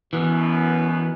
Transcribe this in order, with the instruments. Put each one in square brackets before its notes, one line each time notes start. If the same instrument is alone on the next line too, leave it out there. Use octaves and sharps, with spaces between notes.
[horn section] F#2 B2 B3 [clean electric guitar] E3